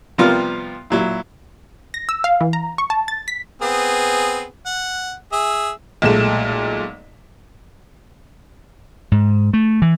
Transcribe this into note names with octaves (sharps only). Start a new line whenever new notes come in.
C3 F3 G3 B3 F4 A#4
A#2 F#3 E4
A#6
E6
F5
E3
A#5
C#6
A5
A6
B6
B3 C4 G#4
F#5
G#4 E5
B1 A#2 G#3 A3 E7
G#2
A3
E3